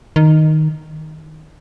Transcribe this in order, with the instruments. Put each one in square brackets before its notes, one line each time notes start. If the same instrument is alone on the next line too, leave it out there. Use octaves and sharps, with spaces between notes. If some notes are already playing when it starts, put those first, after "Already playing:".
[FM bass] D#3